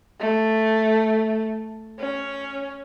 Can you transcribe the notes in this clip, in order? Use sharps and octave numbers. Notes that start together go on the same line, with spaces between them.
A3
C#4